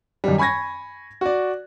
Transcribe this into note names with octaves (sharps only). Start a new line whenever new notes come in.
F#2 D#3 G3
G#5 B5 C#6 G#6 A#6
F#4 D5